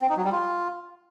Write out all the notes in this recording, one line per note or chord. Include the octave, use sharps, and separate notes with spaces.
C4
D#4
F#3
G3
F4